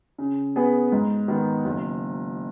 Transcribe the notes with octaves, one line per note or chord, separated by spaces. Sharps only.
C#3
B3 G#4 B4
G#2
D#3 B3
F#1